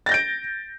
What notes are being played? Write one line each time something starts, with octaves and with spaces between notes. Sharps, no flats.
G6 A6 A#6 D7